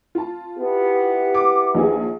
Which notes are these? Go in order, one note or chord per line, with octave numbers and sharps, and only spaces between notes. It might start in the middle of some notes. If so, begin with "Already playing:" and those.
F4 A5
B3 E4 G4
D6
A#1 D#4 G#4